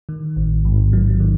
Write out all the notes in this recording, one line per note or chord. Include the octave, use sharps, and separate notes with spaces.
D#3
A1
G#2
F#3
D#3